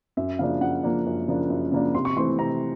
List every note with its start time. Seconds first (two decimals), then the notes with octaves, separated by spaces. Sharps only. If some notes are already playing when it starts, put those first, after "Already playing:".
0.17 F#2 E5
0.39 C#3 F3 A#3 D4 F5
0.61 F#2 F#5
0.84 C#3 F3 A#3 D4
1.06 F#2
1.28 C#3 F3 A#3 D4
1.50 F#2
1.72 C#3 F3 A#3 D4
1.95 C3 C6
2.05 C#6
2.17 E3 A3 C4 C6
2.38 C3 A#5